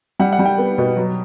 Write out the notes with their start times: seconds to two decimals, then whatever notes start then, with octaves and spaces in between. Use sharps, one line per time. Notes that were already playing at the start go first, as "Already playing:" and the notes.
0.19 G3 F#5
0.33 F#5
0.39 G3
0.45 G5
0.58 B3
0.78 B2
0.97 F#3